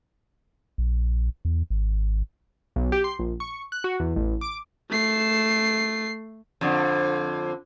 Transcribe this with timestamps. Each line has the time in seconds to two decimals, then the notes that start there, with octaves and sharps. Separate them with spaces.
0.78 A#1
1.45 E2
1.70 G#1
2.76 B1
2.92 G4
3.04 C6
3.19 A#1
3.40 C#6
3.72 F#6
3.84 F#4
4.00 E2
4.16 A1
4.41 D6
4.90 A3 C7
6.61 F2 D3